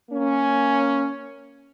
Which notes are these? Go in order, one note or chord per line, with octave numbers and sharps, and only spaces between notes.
A#3 C#4